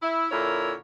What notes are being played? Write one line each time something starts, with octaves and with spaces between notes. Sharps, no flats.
E4
A#2 D3 E4 A#4 C#5